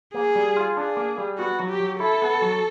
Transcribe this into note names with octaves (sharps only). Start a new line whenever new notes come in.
A#3 G#4
G3
F4
D4 G#4
A#3
G3
B3 F#4
F#3
G4
F#3
E4 A4
B3
F#3